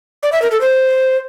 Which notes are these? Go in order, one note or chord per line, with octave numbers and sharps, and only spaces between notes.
D5
E5
A#4
A4
C5